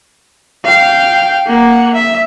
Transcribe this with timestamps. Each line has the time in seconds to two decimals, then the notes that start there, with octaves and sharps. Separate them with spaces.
0.65 F5 G5
1.47 A#3 F#5
1.94 E5